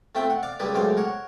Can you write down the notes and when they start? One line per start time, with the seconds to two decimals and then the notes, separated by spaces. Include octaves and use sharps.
0.15 A3 C4 F4 E5 G5
0.30 F#5
0.43 D5 F5 D6
0.60 C#2 G3 A#3 B4 D5
0.74 C#2 F#2 A2 C5 D5 F5
0.97 A#4 C#5 F#5